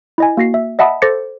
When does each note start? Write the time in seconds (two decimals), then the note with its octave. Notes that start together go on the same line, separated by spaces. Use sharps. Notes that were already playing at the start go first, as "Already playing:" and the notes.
0.18 E4 D#5 G#5
0.37 A#3 F#4 A#6 C7
0.54 E5
0.79 D#5 E5 F#5 A5 B5 D#6
1.02 A4 C5 D6 A6 A#6 C#7